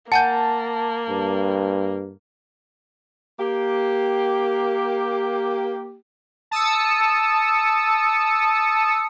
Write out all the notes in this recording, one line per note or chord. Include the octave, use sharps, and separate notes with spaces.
A#3 F#5 G#5 A5 G6
G2
A#3 G4
A5 D#6 E6 C#7